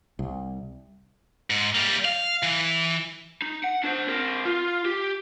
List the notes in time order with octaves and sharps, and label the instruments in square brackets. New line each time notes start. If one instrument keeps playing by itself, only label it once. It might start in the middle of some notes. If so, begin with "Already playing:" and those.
[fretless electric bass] C2
[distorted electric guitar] G#2
G3 A#3
F5
E3
[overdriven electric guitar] D#4
F#5
D4 C5
C4 A#4
F4
G4